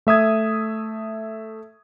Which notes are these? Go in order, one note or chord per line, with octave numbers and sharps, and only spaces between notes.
A3 E5 D#6 G#6